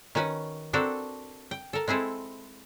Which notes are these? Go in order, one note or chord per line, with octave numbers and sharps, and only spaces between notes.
D#3 C#4 F#4 B4
C4 D4 F#4 A4 A#4
G5
A4 A#4
G#3 C4 E4 G#4 A4